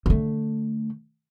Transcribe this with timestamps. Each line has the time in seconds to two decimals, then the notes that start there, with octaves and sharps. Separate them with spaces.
0.06 D3 A3